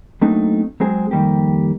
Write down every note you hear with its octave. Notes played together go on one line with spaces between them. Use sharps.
F#3 A3 A#3 C4 D4 D#4
F#3 G#3 C4 G#4
F2 D#3 G3 A#3 G4